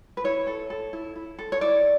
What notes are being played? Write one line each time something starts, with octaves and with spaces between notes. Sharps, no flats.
B4
E4 C#5
A4
A4
E4
E4
A4
C#5
E4 D5